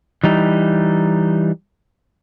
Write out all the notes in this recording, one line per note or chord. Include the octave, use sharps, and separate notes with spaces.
E3 G3 D#4